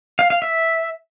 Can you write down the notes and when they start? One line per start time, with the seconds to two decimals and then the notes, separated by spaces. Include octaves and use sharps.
0.19 F5
0.30 F5
0.42 E5